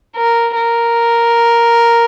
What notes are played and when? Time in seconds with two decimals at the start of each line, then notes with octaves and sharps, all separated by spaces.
0.17 A#4
0.56 A#4